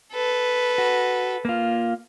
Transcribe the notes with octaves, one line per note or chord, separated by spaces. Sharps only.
A4 B4
F#4
A#3 F4